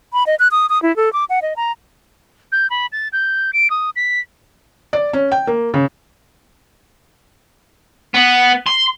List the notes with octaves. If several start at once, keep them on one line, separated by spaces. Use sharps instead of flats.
B5
D#5
F#6
D#6
D#6
E4
A4
D6
F#5
D#5
A#5
G6
B5
A6
G6
D7
D#6
B6
D5
C#4
G5
A#3
C#3
B3
C6